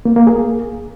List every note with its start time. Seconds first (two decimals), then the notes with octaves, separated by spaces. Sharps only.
0.05 A#3
0.16 A#3
0.27 G#4